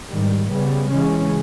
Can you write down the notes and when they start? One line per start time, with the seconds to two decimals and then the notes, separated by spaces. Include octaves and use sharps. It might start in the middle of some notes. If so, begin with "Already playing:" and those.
0.11 G#2 D#3 G3
0.50 C#3 G3 B3
0.90 C#3 E3 G#3 C#4